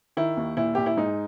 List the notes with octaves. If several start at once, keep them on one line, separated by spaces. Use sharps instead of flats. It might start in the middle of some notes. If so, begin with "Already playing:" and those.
D#3 E4
D#2
A#2 E4
A#2 G4
E4
G#2 D#4